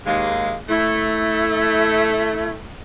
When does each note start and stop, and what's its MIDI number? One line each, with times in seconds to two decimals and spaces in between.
0.06 0.55 39
0.06 0.55 56
0.06 0.53 77
0.69 2.59 57
0.69 2.51 64